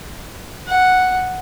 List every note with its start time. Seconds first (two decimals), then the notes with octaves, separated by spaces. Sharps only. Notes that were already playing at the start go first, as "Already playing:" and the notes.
0.67 F#5